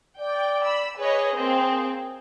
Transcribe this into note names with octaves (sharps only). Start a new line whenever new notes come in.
D5 G5
B5 E6
G#4 B4 C#5 D#5
A#3 C4